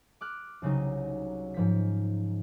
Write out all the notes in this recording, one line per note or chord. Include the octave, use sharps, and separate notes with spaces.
D6 F6 F#6
C2 C#3 F#3 D#4
G#2 F3 B6